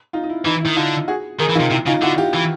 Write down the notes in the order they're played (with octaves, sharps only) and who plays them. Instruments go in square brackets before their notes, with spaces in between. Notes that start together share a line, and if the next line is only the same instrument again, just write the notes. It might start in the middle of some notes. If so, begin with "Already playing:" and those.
[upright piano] D#4 F4
D#4
E4
[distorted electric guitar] E3 [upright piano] D#4
[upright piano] E4
[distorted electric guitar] D#3
[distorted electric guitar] D3 [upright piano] D#4 F4
[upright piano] F#4 G#4
[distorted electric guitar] D#3 [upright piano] G#4 A#4
[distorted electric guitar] E3
[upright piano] D#4 F4
[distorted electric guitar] C3
[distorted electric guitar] C3 [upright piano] E4
[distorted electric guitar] C#3 [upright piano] D#4 F4
[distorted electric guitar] D3 [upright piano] E4 F#4
[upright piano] F4 G4
[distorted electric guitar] E3